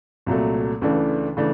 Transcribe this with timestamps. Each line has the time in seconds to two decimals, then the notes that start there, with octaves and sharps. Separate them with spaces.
0.26 C2 A#2 F#3 A3
0.81 C#2 C#3 E3 A3 D4
1.37 C#3 E3 A3 D4